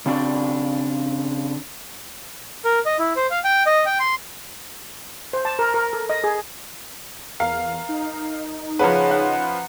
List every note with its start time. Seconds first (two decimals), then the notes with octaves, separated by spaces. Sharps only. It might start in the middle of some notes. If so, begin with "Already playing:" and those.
0.06 C#3 C4 D4 F#4 D5
2.65 A#4
2.86 D#5
2.99 E4
3.16 C5
3.31 F5
3.44 G5
3.66 D#5
3.86 G5
4.00 C6
5.33 C5
5.45 A5
5.59 A#4
5.74 A#4
5.93 A4
6.10 D#5
6.24 G#4
7.40 E2 A#4 F5
7.89 D#4
8.79 C#3 F3 C#4 B4 F#5 A#5
9.11 F#5